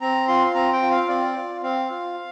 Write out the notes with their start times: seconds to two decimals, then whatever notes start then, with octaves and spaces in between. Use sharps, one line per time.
0.01 C4 A#5
0.28 F4 C6
0.55 C4 A#5
0.73 G5
0.82 F4
0.91 F5
1.09 C4 D5
1.36 F4
1.63 C4 F5
1.90 F4